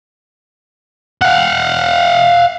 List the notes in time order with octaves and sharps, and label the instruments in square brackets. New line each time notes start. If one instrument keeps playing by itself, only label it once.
[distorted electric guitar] F5 F#5